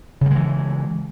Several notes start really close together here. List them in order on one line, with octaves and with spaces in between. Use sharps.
C#3 G3 G#3 E3